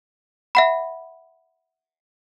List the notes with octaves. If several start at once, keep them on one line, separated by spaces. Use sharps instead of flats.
E5 F#5 B5